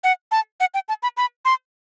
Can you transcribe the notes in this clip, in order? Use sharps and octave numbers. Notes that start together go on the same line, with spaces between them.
F#5
A5
F#5
G5
A5
B5
B5
C6